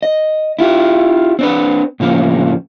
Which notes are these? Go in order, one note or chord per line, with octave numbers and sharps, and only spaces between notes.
D#5
E4 F4 G4
C4 D4 B4
A2 C#3 F3 A#3